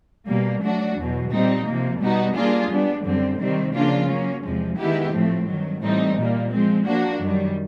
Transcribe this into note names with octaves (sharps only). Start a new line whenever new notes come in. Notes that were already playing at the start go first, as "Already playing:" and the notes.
B2 G3 A#3
F#3 A3 D4 F#4
E2 B2 F#3
A#2 G3 C4 D#4
C3 F3 A#3
B2 G3 B3 D#4 F#4
G3 A#3 D4 F4 G#4
G3 B3 D4
F#2 D3 G3 C4
C3 D#3 G3 C4
C#3 F3 A#3 D4 F4
F#3 A#3 C#4
E2 C3 F3 G#3
D#3 G#3 B3 E4 G4
A2 F3 A3 C4
G2 D#3 F#3
A2 E3 G3 C4 D#4
A#2 G3 A#3
F3 G#3 C4
F3 A#3 D4 F#4
F#2 D#3 G3